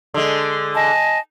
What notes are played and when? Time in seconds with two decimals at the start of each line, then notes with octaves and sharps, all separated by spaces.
0.14 D3 G#3
0.74 D#5 G#5 A5